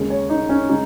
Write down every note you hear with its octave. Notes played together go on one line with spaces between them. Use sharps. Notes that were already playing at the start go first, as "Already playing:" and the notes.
Already playing: D#2 C#3 G#3
C#5
D#4
C#4
C#3 G#3 D#4